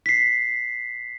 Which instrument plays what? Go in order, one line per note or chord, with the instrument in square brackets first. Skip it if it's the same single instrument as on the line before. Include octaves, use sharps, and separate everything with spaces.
[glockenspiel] B6 C7